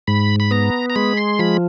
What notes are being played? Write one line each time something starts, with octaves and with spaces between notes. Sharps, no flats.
G#2 B5
B5
B3 A#5
A#5
G#3 B5
C6
F3 B5